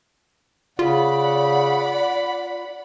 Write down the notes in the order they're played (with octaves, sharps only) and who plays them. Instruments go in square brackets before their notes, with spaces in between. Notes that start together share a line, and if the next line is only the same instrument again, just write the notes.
[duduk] C#3 [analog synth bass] F4 [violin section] D5 F#5 B5